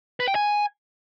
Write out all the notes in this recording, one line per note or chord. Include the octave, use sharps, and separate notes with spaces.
B4
G5
G#5